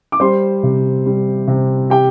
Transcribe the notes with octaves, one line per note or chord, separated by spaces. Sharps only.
D6
G3 C5 C6
C3
G3
C3
G4 G5